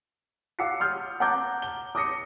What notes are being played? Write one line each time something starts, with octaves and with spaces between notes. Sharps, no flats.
F5 F#5 D6 E6 C7 C#7
C6 D#6 F6 G6
F#5 A5 A#5 D6 G6
G7
D6 D#6 A#6 C#7